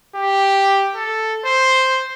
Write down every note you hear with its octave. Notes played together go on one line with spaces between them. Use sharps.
G4
A4
C5